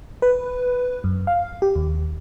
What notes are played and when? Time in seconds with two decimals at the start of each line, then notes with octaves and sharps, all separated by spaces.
0.22 B4
1.04 F#2
1.27 F5
1.62 G4
1.75 D#2